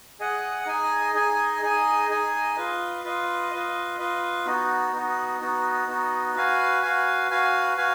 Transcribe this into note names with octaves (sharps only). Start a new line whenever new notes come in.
G#4 D#5 F#5
D#4 G#4 D#5 G#5
D#4 G#4 D#5 G#5
D#4 G#4 D#5 G#5
D#4 G#4 D#5 G#5
F4 B4 D#5
F4 B4 D#5
F4 B4 D#5
F4 B4 D#5
B3 D#4 F#4
B3 D#4 F#4
B3 D#4 F#4
B3 D#4 F#4
F#4 B4 F5 G#5
F#4 B4 F5 G#5
F#4 B4 F5 G#5
F#4 B4 F5 G#5